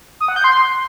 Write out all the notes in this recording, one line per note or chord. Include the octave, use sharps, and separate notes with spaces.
D#6
F#5
G6
C6